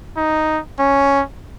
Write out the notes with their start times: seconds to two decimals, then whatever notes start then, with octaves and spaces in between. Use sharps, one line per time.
0.17 D#4
0.79 C#4